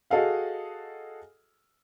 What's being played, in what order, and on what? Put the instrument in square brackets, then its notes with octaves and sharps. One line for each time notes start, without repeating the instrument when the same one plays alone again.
[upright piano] F#4 G#4 A4 D#5 F5 F#5